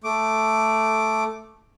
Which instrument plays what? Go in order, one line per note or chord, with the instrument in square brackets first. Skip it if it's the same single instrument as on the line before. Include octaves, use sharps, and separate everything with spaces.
[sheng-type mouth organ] A3 D6